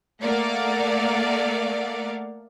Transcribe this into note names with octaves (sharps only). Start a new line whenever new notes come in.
A3 A#3 A#4 D5 F5 F#5